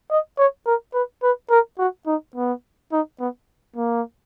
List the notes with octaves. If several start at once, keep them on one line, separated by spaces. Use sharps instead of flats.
D#5
C#5
A#4
B4
B4
A#4
F#4
D#4
B3
D#4
B3
A#3